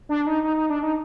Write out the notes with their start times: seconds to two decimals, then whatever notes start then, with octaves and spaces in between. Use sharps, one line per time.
0.09 D4
0.27 D#4
0.44 D#4
0.56 D#4
0.70 D4
0.83 D#4